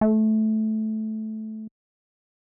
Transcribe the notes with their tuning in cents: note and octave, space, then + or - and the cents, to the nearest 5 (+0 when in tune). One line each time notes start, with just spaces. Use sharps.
A3 -15